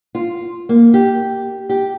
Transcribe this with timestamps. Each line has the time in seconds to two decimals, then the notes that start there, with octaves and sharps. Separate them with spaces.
0.15 F4
0.69 A#3
0.94 G4
1.69 G4